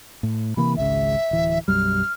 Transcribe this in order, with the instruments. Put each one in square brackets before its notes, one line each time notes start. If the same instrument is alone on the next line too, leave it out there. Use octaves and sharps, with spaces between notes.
[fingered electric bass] A2
[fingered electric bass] C3 E3 A#3 [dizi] B5
[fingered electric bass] G#1 C#2 C#3 [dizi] E5
[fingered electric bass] D1 E3
[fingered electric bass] B1 F#2 G3 [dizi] F6